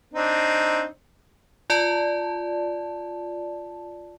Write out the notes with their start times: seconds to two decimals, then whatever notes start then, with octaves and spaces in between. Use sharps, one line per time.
0.13 C4 D4 D#4
1.70 F4 D5 A5